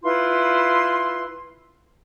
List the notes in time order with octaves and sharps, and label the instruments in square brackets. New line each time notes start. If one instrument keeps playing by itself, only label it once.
[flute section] E4 F4 B4 C6